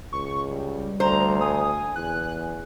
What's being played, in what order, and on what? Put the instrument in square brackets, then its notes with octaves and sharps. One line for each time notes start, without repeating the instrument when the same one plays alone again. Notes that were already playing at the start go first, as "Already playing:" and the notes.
[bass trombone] C#2 [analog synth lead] C#6
[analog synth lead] G3
[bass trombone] D2 [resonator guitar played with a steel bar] C5 [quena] A#5
[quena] G#5 [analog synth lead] D#6
[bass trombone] E2 [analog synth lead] F#6